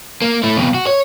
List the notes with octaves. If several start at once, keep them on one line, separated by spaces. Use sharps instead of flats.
A#3
A3 E4
F2 B2
F#4
C#5